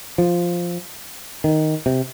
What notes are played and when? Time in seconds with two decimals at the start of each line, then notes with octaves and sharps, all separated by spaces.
0.18 F3
1.44 D#3
1.86 C3